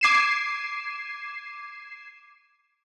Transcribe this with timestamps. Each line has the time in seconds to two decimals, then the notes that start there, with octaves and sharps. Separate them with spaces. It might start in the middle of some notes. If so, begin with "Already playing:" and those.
0.01 D6 G#6 C7 D#7 E7